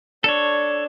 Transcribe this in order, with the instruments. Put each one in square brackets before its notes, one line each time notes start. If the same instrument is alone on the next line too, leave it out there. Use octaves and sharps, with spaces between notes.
[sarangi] D4 [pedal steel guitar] A4 C#5